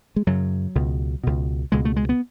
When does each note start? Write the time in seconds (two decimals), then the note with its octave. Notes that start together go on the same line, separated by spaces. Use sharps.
0.16 G#3
0.27 F#2 C#3 F#3
0.75 C#2 B2
1.24 C#2 B2
1.72 C#2 B2 G#3
1.85 A3
1.97 G#3
2.09 B3